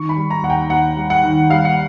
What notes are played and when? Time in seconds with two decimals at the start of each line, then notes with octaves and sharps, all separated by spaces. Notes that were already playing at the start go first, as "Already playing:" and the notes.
Already playing: D#3 C#6
0.09 B5
0.16 G3
0.30 A#5
0.42 D#2 F#5
0.50 G5
0.69 D#2 F#5
0.96 G3
1.10 F#5
1.23 D#3
1.50 G3 F5
1.65 F#5